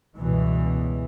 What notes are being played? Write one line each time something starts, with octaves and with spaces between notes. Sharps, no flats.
C#2 G2 B2 E3